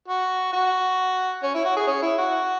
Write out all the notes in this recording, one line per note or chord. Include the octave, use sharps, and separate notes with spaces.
F#4
F#4
C#4
E4
F#4
G#4
C#4
E4
F#4